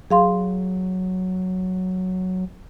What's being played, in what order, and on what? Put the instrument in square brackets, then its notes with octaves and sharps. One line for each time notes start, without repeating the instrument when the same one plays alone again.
[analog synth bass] F#3 [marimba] G#4 F5 C6